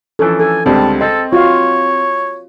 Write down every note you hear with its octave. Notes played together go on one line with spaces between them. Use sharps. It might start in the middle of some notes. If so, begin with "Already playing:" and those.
E3 F3 C#4 A4
A4 G#5
C#2 D3 G3 C4 A5
C4 A4 D#5
F4 F#4 C#5 F5